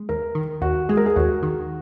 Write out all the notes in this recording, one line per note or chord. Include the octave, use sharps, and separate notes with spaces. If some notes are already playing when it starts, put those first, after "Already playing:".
Already playing: G#3
D#2 A#4
D#3
D#2 F#4
G#3 G#4
A#4
G#4
D#2 F#4
D#3